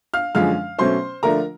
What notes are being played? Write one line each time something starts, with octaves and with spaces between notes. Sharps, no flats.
F5 F6
F#2 D3 F3 G#3 C#4 F5 F6
B2 F#3 A3 C#4 C5 C6
D3 F3 A3 D4 F4 A#4 A#5